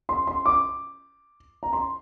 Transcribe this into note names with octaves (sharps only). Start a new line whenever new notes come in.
C6
C6
D6
A#5
C6